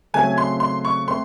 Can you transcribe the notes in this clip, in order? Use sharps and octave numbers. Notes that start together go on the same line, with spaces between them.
C#3 F#3 A3 C4 G#5
C6
C6
C#6
A3 C4 C6